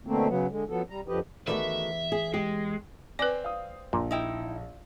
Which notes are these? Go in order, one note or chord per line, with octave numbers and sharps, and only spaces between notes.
B2 D3 A3 A#3 C4
C#3 F#3 B3
D3 G#3
F3 F#3 B3 A4
G3 A#5
F2 D3 F3 G4 B4 D#5
E2 D#3 A3 F#4 B4 D5 E5
G#4
G#3 G4
C4 B4 D5 G#5 D6
F5 D#6
A#1 A#2
D#4 E4 G5